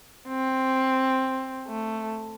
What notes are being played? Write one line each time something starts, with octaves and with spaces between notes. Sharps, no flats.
C4
A3